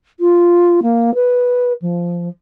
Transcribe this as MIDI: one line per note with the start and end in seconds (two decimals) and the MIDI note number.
0.20 0.80 65
0.82 1.14 58
1.14 1.73 71
1.82 2.29 53